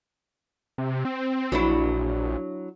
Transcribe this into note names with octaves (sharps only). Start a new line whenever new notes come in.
C3
C4
A#1 F#3 D4 E4